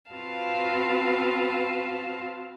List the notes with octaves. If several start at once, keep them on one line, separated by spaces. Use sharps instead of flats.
C4 F4 F#4 B4 F5 A5